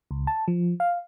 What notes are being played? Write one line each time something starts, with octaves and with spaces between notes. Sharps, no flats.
C#2
A5
F3
F5